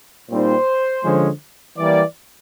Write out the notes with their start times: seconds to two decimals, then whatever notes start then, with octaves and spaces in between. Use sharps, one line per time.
0.30 A#2 G3 C4 D#4 C5
1.04 D3 F3 G#3 C#4
1.77 E3 G3 A#3 D5